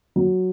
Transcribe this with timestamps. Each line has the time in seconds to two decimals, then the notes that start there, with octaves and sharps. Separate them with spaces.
0.16 F#3